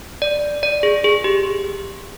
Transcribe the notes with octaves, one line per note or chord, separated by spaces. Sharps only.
D5
D5
G#4
G#4
G4